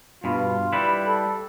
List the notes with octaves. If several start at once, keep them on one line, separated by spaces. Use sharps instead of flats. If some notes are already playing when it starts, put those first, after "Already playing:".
G2 B2 F4
G3 E4 B4
A4